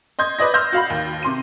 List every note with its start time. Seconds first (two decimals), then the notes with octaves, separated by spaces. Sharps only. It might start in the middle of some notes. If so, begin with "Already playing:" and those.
0.19 D#5 C6 G6 G#6
0.38 B4 D5 D#5 A#6
0.54 C6 E6 F6 G6 A#6
0.72 F#4 F5 B5
0.90 D#2
1.23 C3 C6 D#7